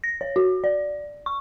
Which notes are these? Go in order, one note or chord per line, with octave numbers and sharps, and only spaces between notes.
A#6
C#5
F#4
D5
C#6